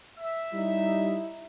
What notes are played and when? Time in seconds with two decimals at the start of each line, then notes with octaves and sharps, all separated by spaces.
0.18 E5
0.53 G3 D#4 E4